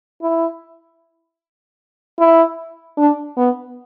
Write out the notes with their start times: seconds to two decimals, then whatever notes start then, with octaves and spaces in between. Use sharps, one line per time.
0.22 E4
2.19 E4
2.98 D4
3.37 B3